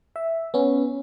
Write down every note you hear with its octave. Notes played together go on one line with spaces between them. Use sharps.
E5
B3 C#4